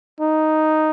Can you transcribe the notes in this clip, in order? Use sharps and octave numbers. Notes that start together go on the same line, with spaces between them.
D#4